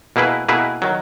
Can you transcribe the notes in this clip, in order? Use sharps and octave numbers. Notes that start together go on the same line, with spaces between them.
B2 A#3 E4 G#4 B4
B2 A#3 E4 G#4 B4
D#3 F#3